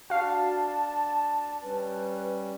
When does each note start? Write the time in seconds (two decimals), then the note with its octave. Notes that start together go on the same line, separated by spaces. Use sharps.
0.10 D4 F#4 F5 A5
1.63 G3 C#4 B4